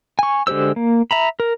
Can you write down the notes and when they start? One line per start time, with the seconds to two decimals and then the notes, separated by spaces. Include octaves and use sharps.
0.19 G#5 C#6
0.47 D3 G#3 G4 C5 E6
0.76 A#3
1.11 E5 A#5 B5
1.40 A#4